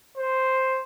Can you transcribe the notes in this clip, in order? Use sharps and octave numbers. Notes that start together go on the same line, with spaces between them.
C5